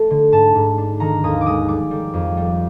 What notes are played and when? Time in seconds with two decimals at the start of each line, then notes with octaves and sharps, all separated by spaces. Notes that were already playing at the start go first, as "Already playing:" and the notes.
Already playing: A3
0.10 D3
0.32 G#2 A5
0.55 G#2
0.78 D4
1.00 D#3 A#5
1.24 D#2 D#6
1.41 D6
1.46 G#3 D#6
1.68 G3 D6
1.91 G3
2.13 F2
2.37 G3